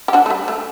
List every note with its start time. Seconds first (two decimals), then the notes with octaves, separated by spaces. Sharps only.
0.08 G4
0.13 D4 F#4
0.26 A3
0.30 G3
0.48 A3